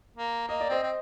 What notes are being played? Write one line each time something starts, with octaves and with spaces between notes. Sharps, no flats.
A#3
A#3 D#5
D5
C4 C5 D#5
C4